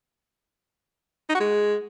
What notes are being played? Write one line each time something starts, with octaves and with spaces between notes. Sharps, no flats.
D#4
F#4
G#3